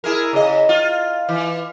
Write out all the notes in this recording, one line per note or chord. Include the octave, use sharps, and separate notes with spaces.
E4 G#4 A#4
C#3 D#5
F4
E3